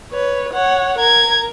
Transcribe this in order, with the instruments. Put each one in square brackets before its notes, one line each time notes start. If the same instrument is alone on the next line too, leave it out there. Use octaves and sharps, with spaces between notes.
[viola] B4 C#5
C#5 F#5
[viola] A#4 [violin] A#5 G#6